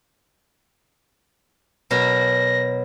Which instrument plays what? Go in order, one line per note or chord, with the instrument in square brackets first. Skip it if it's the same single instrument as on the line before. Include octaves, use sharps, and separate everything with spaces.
[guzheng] B2 F#3 A#4 [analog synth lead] A#6